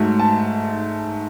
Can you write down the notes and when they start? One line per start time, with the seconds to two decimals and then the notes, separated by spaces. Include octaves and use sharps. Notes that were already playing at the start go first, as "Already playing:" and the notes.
Already playing: G#2 F#3 A3
0.19 A5